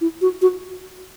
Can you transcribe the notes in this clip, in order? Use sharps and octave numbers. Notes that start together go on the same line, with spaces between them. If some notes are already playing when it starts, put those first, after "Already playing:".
E4
F#4
F#4